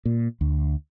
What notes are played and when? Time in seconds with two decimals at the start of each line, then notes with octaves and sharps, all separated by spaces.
0.05 A#2
0.41 D2